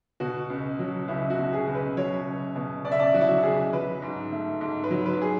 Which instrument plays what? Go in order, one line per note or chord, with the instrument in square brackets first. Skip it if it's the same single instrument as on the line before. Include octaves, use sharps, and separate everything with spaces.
[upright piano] B2 F#4
C#2
F#3
C#2 E4
F#4
B2
G#4
C#2
B4
F#3 C#5
C#2
B2
C#2 D5
E5
D5
F#3 F#4
E4
F#4
C#2 G#4
F#3 B4
G#2
A3
G#2
B4
F#3
B4
G#4